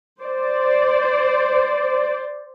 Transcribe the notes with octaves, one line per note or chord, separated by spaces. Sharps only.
C5 D5